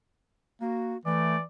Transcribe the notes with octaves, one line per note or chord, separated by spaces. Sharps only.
A#3 F#4
E3 A3 D5